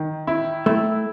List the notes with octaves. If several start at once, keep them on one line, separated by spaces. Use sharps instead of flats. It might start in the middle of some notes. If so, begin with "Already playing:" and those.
Already playing: D#3
E4
A3 E4